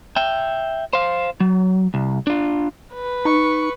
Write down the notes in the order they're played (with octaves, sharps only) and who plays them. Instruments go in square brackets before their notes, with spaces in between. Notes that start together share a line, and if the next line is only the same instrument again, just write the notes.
[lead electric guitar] E5 G5
C5 F5
F#3
C2
D4 F4
[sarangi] B4
[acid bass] D#4 [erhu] C#6